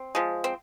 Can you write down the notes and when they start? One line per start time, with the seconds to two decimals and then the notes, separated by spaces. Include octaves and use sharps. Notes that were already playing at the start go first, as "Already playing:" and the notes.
Already playing: C4
0.15 F3 G#3
0.44 C4